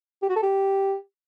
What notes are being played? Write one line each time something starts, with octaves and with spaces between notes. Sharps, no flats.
G4
F#4
A4
G4